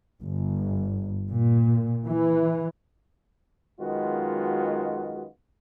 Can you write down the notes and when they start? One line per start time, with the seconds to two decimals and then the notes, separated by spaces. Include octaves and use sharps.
0.21 G1
1.30 A#2
2.07 E3
3.81 F#2 D#3 G#3 B3 F4 F#4